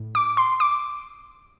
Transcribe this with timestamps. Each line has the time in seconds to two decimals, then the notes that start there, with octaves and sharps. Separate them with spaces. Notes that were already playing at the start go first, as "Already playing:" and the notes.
Already playing: A2
0.15 D6
0.37 C6
0.60 D6